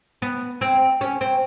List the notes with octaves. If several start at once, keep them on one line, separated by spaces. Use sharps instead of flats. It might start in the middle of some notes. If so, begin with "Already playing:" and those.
B3
C4
C#4
C4